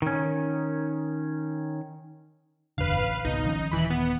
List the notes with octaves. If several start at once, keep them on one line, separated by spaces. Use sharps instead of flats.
D#3 C#4
F#1 E2 D3 B4 F5
A1
G#1 C#2 B2 D#4
D#3 F3 C#4
D#1 D#3 E3 B5
B3